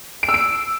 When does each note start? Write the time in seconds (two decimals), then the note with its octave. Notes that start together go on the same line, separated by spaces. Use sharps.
0.23 D7
0.29 E6
0.34 D7